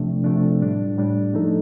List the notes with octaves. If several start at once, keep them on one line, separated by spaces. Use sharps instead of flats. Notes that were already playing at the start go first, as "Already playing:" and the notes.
Already playing: C3 F3 A3 D4
C3 F3 A3 D4
A2 G3 D4
A2 G3 D4
F3 A3 D#4 A4